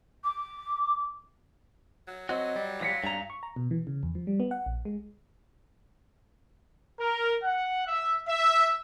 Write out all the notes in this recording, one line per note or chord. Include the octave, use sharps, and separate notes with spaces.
D6
F#3
F#3 C4 F#4 D#5
G3
F5 C6 A#6 B6 C#7
G2 F5 G#5 A#5
C#6
A#5
B2
E3
C#3
E2
F3
G3
B3
F#5
A#1
G#3
A#4
F#5
E5
E5